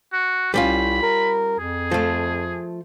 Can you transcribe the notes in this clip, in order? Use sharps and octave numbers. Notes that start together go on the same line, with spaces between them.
F#4
C2 G3 C#4 F4 B5
A#4
F2 G#4
F3 A3